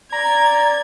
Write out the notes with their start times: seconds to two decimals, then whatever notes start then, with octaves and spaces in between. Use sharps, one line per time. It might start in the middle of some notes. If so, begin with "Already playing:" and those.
0.12 D5 A#5 G#6